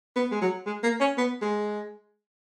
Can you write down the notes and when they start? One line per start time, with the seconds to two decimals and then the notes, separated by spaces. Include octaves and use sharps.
0.16 B3
0.32 G#3
0.42 F#3
0.66 G#3
0.83 A#3
1.00 C#4
1.18 B3
1.42 G#3